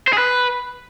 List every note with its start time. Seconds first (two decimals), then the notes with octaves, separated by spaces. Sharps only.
0.08 C5
0.13 G#4
0.18 B4